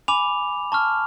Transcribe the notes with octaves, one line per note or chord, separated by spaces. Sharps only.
G#5 B5 D6 F7
A5 C#6 F6